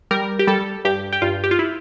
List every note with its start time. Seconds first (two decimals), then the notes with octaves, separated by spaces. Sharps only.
0.11 G3 A#4
0.39 G4
0.47 G3 A4
0.85 G2 G4
1.13 G4
1.22 G2 F4
1.44 G4
1.51 F4
1.59 E4